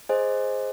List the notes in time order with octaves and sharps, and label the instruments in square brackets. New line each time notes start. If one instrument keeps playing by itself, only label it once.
[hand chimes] G#4 C5 D#5 G#5